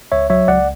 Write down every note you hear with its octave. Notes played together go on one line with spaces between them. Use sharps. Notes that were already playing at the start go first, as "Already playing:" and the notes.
C#2 C#5 E5
F#3 C#5 E5
C#2 D5 F#5